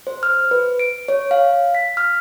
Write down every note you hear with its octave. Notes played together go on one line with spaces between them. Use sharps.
C5
F6
B4
D7
C#5
F5
B6
F6